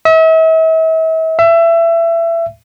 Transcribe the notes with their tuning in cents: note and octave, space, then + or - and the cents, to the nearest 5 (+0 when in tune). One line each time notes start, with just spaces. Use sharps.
E5 -40
E5 +25